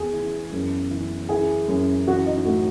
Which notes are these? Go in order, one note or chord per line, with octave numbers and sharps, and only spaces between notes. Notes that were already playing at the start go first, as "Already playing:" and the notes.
Already playing: E2 G#4
E3
F#2
E3
E3 G#4
F#2
E3 F#4
D#4
A2 F#4